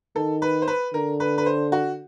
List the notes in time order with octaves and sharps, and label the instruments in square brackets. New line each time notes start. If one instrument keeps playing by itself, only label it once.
[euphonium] D#3 [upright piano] A4
[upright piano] B4
C5
B4
[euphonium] D3 [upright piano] A#4
[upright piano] B4
B4
C5
F#4